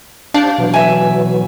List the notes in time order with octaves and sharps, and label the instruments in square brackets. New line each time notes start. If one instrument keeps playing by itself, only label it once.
[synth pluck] D4 [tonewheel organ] G4 C5 [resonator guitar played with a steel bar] F5
[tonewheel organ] B2 E3 F#3
[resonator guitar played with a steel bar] E5 G#5